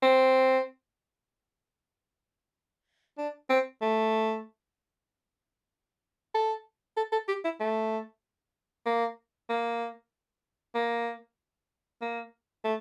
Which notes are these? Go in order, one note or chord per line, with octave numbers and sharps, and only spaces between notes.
C4
D4
C4
A3
A4
A4
A4
G4
E4
A3
A#3
A#3
A#3
A#3
A3